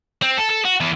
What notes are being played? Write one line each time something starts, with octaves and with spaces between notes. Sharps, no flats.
C4
A4
A4
F#4
E2